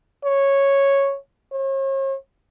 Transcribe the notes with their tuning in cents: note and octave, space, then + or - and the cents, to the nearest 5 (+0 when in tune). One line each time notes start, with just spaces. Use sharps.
C#5 -5
C#5 -45